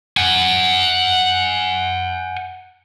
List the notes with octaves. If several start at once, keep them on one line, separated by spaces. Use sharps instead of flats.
F#5 G#5